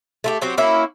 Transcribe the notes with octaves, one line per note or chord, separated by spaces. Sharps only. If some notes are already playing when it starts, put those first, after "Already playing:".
A3 F4 G4
F#3 C4 F#4 G4
A#3 C#4 E4 F#4